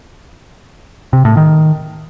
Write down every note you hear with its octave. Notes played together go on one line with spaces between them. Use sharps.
C3
A2
D#3